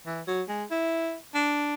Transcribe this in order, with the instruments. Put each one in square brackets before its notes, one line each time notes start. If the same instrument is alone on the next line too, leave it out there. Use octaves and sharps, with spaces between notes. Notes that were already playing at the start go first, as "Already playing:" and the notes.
[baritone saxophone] E3
F#3
G#3
E4
D4